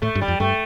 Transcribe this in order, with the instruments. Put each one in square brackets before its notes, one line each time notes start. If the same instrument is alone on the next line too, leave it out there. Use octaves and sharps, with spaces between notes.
[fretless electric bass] A2 [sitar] A3
[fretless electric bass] G2
[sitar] G3
[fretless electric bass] F2
[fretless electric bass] G2 [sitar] A3